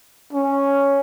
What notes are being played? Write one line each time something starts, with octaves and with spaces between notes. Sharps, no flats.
C#4